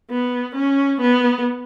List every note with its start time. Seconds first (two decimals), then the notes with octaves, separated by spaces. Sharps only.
0.10 B3
0.55 C#4
1.01 B3